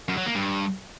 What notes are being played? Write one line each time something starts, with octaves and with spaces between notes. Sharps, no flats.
F#2
F#3
A#3
G2